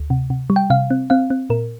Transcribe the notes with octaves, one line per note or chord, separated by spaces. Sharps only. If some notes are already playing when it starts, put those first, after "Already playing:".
Already playing: D2
C3
C3
G3
G5
C3 F5
C4
C4 F5
C4
A#2 A#4